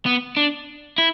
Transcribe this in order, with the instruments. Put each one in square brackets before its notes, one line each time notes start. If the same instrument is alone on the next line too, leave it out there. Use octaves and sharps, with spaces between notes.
[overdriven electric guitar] B3
D4
E4